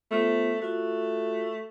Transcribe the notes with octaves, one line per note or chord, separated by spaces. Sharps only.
A3 B3 F4 C5
A3 F4 F#4